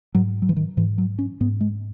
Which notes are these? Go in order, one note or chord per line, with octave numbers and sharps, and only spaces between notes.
G#2 F#3
F#3
E3
D#3
G#2 E3
F#3
C#4
G#2 B3
G#3